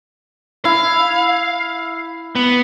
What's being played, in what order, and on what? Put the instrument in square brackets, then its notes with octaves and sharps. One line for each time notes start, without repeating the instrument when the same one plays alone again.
[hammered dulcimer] E4 [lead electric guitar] F5
[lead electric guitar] B3